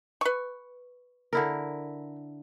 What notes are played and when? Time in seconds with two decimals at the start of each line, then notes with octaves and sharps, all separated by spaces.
0.21 B4 C#6
1.33 D3 E4 A#4